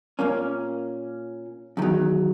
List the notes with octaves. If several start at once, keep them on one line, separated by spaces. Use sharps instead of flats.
A#2 A#3 C#4
E2 D#3 F#3